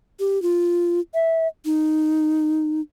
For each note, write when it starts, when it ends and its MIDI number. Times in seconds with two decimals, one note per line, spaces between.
0.20 0.41 67
0.42 1.00 65
1.14 1.48 76
1.65 2.81 63